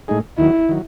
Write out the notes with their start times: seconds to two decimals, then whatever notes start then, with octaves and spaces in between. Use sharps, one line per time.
0.08 A2 G#3 D#4 G#4
0.38 D#2 D#3 F#3 E4
0.69 D#3 F#3